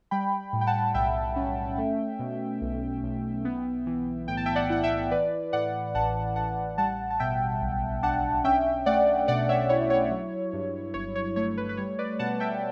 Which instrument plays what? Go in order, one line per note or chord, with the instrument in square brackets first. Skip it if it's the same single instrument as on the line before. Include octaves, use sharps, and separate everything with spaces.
[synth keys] G3 G5 B5
A2
G5
F#5 A5
B1 E5 G5
C#4
A3
B2
B1
B1
B3
E3
A2 G5
A5
E5 G5
D5 F#5
E4 F#5
E5 G5
E3 B4 D5
A2 D5 F#5
A1 F#5 A5
A1 F#5 A5
G3 F#5 A5
A5
B2 E5 G5
B1
D4 F#5 A5
C#4 E5 G5
A3 D5 F#5
B2 D5 F#5
C#5 E5
E4 C#5
C#5
F#3
G2
G1 C#5
C#5
A3 C#5
B4
B4
G3 C#5
B4 D5
B2 F#5 A5
E5 G5